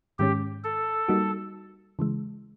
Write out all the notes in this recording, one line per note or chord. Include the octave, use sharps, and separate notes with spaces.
G#2 D#3 G#3 C#4 G4
A4
G3 A#3 D#4 F#4
C#3 E3 G#3